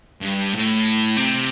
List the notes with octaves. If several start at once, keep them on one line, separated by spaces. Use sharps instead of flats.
G2
A2
C3